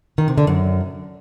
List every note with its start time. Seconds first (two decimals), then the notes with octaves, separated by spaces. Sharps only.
0.18 D#3
0.28 C3
0.38 D3
0.47 F#2